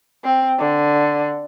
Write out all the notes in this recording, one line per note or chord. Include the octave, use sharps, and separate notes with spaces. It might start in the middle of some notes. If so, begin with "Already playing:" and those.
C4
D3